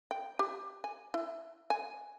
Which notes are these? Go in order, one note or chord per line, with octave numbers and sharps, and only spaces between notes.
G5
G4
G#5
E4
G#5